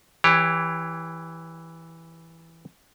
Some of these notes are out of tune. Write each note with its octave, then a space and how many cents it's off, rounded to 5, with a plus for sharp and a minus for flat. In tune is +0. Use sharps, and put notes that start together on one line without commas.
E3 +0 G4 +20 C#5 +0